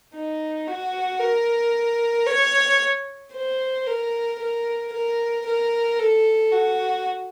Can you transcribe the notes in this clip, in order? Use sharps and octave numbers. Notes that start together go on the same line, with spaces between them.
D#4
F#4
A#4
C#5
C5
A#4
A#4
A#4
A#4
A4
F#4